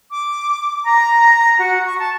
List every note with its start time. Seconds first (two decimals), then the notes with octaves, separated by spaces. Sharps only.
0.11 D6
0.85 A#5
1.59 F#4
1.86 C#6
1.99 A5